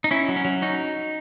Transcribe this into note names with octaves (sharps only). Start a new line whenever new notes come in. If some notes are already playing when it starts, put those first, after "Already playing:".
D#4
C#4 E4
F#3
C#4
F#3
C#4 D#4